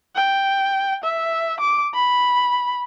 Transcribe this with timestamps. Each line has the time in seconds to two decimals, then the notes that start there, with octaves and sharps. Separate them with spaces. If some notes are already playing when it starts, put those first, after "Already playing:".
0.16 G5
1.04 E5
1.60 D6
1.94 B5